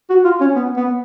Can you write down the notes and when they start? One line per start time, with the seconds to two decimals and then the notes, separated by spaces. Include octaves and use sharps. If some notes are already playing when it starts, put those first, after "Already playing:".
0.10 F#4
0.24 F4
0.41 C#4
0.56 B3
0.77 B3